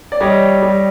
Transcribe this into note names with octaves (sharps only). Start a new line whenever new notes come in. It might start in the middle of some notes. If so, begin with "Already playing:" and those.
D5
G3 C#5 D#5
G3